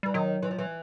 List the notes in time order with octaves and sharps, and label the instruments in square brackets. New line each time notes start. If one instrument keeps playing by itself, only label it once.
[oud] E3 [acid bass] G3
[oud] D#3 [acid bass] F#3
[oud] E3
F3
E3